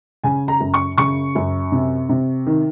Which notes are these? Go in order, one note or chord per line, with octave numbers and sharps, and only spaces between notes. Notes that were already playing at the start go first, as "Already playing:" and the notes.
C#3 G#5
A#5
F#2
C#6
C#3 C#6
F#2
C3
C3
D#3